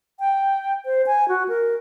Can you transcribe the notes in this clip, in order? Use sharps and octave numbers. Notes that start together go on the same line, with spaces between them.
G5
C5
G#5
F#4
A#4